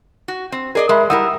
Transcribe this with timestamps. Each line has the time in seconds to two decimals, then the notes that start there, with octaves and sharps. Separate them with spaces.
0.28 F#4
0.52 C4
0.75 G#4 A#4 D5 D#5
0.89 G#3 A#4 E5 B5
1.10 G3 E4 A#4 F#5 D#6 E6